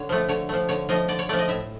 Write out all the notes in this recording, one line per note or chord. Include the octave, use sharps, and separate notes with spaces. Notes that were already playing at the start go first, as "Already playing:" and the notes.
Already playing: D3 C#5
F3 A3
D3 C#5
F3 A3
D3 C#5
F3 A3 D#5
D3 D5
C#5
F3 A3 D5
D#5
A2 E5